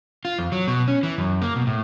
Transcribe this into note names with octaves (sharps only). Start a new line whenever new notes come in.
F4
F2
F#3
B2
C#4
E3
F#2
A#3
B2
A2